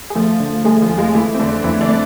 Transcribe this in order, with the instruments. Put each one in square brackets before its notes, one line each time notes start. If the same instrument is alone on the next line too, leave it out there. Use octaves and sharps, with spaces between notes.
[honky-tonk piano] G#4
[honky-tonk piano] F3 F4 [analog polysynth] A3
[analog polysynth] D3
[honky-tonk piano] G#3 G#4 [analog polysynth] A3
[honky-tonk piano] F3 F4
[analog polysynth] F2
[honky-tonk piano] G#3 G#4
[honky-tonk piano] E3 E4 [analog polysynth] A3
[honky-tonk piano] C4
[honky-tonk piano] D3 D4 [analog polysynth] A3
[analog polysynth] F2 [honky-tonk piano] E3 E4
[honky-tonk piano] D3 D4
[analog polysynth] A3